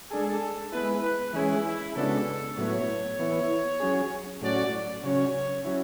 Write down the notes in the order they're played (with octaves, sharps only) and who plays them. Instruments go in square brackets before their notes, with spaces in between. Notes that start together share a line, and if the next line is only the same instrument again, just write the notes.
[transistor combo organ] G#3 D4 G#4 [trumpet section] A4
[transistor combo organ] G#3 B3 E4 [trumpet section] B4
[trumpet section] B4
[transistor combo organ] E3 G#3 C#4 G#4 [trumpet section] E4
[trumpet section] E4
[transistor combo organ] C#3 G#3 B3 D4 F#4 [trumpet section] A4
[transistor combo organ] A2 F#3 B3 E4 [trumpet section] C#5
[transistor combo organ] E3 B3 E4
F#3 C#4 G#4
[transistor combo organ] A2 F#3 C#4 F#4 [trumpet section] D5
[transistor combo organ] C#3 F#3 C#4 [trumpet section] C#5
[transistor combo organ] F#3 C#4 E4